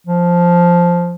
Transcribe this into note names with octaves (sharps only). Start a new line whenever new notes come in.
F3